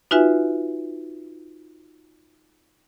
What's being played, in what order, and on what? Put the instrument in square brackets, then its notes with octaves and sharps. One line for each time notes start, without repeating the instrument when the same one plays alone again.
[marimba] D#4 F4 F#4 B4 E5 G#5